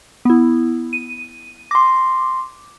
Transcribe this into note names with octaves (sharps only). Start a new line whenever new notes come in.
B3 E4
D#7
C6 D6 A#6